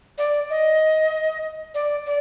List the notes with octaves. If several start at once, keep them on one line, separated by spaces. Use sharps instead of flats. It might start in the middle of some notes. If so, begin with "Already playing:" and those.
D5
D#5
D5
D5